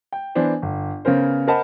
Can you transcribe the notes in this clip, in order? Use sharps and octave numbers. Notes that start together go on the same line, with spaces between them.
G5
E3 B3 D4 C5
G1
C#3 B3 C#4 A#4 C5
A#4 C5 D#5 F#5 A5 B5